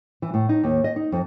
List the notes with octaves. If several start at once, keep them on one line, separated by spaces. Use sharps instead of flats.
E3
A2
D#4
D#2
D#5
D#4
F2